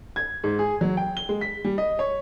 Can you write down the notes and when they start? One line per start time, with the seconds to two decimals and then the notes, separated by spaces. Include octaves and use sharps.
0.16 G#6
0.44 G#2
0.59 G#4
0.81 F#3
0.97 G5
1.17 G7
1.29 G#3
1.41 B6
1.65 G3
1.78 D#5
1.99 C#5